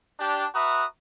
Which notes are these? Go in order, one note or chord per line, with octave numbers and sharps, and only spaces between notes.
D4 G4
F#4 B4 E5 A#5 D#6